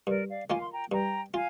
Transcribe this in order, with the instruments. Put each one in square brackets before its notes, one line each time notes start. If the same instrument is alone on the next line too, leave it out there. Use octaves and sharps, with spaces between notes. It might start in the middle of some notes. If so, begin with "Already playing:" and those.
[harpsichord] G2 [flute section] A#4 D5
[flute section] D5 F5
[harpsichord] D#3 A#3 F4 [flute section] F5 G#5
[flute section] C6
G5 A#5
[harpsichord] G2 [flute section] G5 A#5
[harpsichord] F4 [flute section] F5 G#5